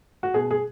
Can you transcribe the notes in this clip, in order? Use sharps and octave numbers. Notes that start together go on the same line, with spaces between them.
F#4
B2 G#4
G#4